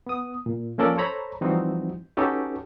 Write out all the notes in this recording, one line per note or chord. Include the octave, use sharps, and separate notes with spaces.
B3 D#6
A#2
F3 A#3 C#4 A4 A#4 D5
A4 C5 C#5 A#5 B5
E3 F3 G3 C4 D#4 F#4
C#4 D#4 F#4 G4 A4 B4